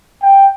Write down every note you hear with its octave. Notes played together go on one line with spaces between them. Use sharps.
G5